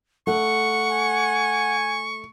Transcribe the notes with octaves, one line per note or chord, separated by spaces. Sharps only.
A3 F#5 C#6
G#5